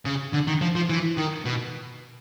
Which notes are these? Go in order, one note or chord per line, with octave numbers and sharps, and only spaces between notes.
C#3
D3
D#3
F3
F3
E3
D#3
B2